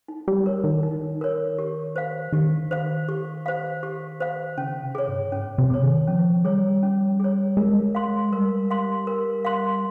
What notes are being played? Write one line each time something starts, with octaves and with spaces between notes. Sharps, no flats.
D#4
G3
A#4 C#5
D#3
D#4
A#4 C#5
G4
C5 F5
D#3 G4
C5 F5
G4
C5 F5
G4
C5 F5
C#3 C#4
C3
G#4 C#5
G2
G#2 C#4
C3
G#4 C#5
D#3
F3 C#4
G3 G#4 C#5
C#4
G#4 C#5
G#3 A#4
F5 C6
G3 A#4
F5 C6
A#4
F5 C6